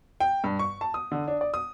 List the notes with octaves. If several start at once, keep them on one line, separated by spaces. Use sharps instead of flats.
G5
G2
C#6
A5
D#6
D3
D4
D5
D#6